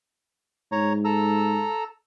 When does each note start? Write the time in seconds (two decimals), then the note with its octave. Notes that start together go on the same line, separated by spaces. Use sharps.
0.72 G#2 C#5 A#5
1.05 A4 A#5 E6